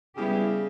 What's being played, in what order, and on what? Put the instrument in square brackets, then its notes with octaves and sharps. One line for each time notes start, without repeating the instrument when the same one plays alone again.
[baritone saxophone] C#3 [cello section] G3 B3 E4 G4